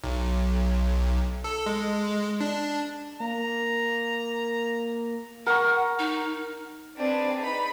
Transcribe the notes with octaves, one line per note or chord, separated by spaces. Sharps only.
B1
A4
G#3
D4
A#3 A#5
A#4 F#5 A#5 C#6
D#4
C4 D4 G#4 B4 D5
D#4 B4 B5